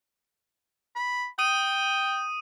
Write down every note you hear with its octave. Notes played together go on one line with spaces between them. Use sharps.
B5
G5 D#6 D#7